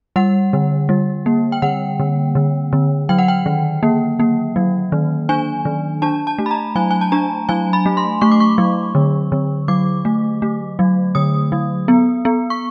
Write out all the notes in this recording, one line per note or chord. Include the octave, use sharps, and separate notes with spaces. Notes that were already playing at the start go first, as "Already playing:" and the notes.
G3 F#5
D3
G3
A#3
G5
D3 F#5
D3
D3
D3
F#3 G5
F#5
G5
D#3
A#3
A#3
F#3
D#3
D4 G#5
D#3
D4 A5
A5
A3
B5
A#5
F#3 G#5
G#5
A5
D4 A#5
F#3 G#5
B5
A3
C6
A3 C#6
D6
C#6
F#3
D3
D3
F#3 D6
A3
A3
F#3
D3 D#6
F#3
B3
B3
C#6